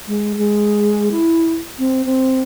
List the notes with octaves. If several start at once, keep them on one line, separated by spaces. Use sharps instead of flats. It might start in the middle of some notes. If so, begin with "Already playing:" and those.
G#3
G#3
E4
C4
C4